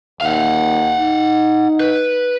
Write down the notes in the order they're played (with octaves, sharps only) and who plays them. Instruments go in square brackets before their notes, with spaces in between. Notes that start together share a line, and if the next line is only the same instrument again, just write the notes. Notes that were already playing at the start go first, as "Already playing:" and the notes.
[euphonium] D#2 [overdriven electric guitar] F5 F#5
[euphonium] D#4
[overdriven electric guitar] B4